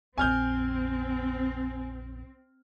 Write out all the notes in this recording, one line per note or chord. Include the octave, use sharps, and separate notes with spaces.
A#1 F2 C4 G#5 F6 G6